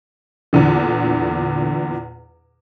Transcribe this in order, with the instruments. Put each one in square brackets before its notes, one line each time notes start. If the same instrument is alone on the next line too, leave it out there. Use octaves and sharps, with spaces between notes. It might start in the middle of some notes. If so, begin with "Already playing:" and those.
[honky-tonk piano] E2 A#2 D3 E3